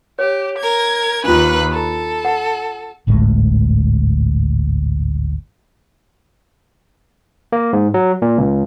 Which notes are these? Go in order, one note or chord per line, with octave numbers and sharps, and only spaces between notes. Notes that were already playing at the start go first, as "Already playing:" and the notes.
G4 C#5
A#4 G#6
D#2 D4 F4 B4 F#6
A4 A#5 B5
F#5
G#1 D2 A2 G#3
A#3
G#2
F#3
A#2
C#2